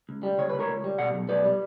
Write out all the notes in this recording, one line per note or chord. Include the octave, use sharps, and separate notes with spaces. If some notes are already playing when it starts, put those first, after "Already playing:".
C#2
G3
C#3 C#5
C#2 B4
A#4 C#5
C#2
G3
B2 D5 F#5
B1
B1 B4 D5
G3